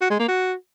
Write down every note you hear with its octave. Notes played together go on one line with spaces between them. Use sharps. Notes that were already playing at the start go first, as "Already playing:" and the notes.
F#4
G#3
A#3
F#4